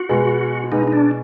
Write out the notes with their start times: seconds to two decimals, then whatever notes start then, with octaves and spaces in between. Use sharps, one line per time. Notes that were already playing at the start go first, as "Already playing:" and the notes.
Already playing: F#4
0.09 B2 G#3 B3
0.72 B2 G#3 B3 D#4
0.87 D#4
0.92 D4